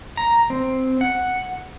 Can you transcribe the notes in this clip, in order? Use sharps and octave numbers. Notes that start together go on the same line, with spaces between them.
A#5
C4
F#5